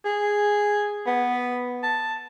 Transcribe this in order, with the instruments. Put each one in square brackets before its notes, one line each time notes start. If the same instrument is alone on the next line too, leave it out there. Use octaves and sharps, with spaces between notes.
[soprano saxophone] G#4
B3
A5